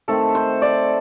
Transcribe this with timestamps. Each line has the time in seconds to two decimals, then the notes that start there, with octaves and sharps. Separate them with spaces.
0.08 D#3 A3 C4 A4
0.35 C5
0.62 D5